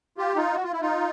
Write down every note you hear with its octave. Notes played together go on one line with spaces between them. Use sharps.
F4 G4
D#4 F4
F#4
F4
E4
D#4 F4